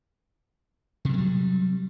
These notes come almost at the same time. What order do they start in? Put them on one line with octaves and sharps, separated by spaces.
C3 F#3 A3 G3